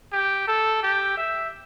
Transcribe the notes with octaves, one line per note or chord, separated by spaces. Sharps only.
G4
A4
G4
E5